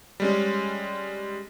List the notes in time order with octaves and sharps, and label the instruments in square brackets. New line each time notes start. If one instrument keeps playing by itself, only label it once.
[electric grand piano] G3 G#3 C#4